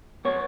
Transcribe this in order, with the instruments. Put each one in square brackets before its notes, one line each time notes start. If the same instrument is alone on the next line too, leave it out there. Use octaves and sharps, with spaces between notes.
[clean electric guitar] B3 C#5